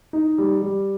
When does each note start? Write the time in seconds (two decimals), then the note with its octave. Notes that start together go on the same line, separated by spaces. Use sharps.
0.13 D#4
0.38 G3
0.62 G3